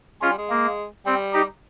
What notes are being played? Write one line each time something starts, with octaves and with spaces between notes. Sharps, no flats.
G#3 C#4 F4
G3
G#3
A#3
G3 C4
D#4 G4